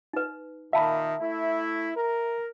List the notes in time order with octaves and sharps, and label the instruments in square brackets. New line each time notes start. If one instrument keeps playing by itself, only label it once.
[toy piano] D#4 B4
[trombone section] A#2 D#3 [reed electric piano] E5 [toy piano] F5 A5 B5
[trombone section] A3 E4
A#4